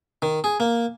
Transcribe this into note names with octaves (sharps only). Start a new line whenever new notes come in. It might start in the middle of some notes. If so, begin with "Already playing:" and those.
D#3
G#4
A#3